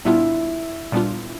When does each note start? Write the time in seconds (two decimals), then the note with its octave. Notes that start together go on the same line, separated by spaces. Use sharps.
0.05 A#2 G3 B3 D4 E4 F4
0.92 A#2 G3 B3 D4 F4